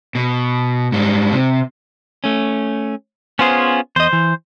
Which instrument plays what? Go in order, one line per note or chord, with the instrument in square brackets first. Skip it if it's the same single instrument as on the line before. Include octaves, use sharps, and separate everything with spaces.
[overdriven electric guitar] B2
G#2 G3
C3
[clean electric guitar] A3 C#4
[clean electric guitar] B3 C5 [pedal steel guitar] C#4 F4 G#4
[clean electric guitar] E2 D#5 [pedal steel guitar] C5
[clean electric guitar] E3